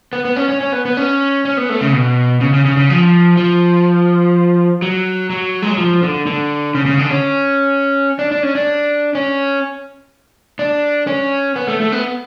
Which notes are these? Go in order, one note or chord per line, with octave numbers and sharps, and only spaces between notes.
B3
B3
C#4
C#4
C#4
B3
B3
C#4
C#4
B3
A3
C#3
B2
C#3
C#3
C#3
C#3
F3
F3
F#3
F#3
G#3
F#3
F3
D3
D3
C#3
C#3
D3
C#4
D4
D4
C#4
D4
C#4
D4
C#4
B3
A3
A3
B3